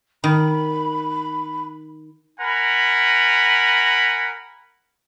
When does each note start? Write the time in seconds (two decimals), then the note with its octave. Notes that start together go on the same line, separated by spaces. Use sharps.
0.24 D#3 B5
2.40 A#4 F#5 G#5 A#5 B5